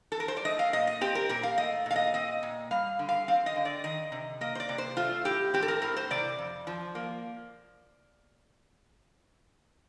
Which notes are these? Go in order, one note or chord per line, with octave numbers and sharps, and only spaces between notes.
A4
A#4
C5
D5
A3 D#5
F5
A#2 D#5
D#5
C4 G4
A#4
A#2 A#4
F5
A3 D#5
A#2 F5
D#5
C4 D#5
A#2
G3 F5
D3
F5
C4 F5
D#5
D3
D5
D#3 D#5
C3
A#3 D#5
C5
D5
C3
C5
A3 F4
A2 G4
C4 G4
A4
A#4
A2 A#4
C5
C3 D5
F2
F3
A#3